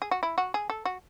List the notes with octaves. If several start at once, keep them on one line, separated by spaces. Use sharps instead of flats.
G#4
F#4
E4
F#4
G#4
A4
F#4